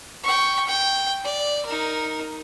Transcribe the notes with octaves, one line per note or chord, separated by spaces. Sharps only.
G5 C#6
G5
D5
D#4 A#4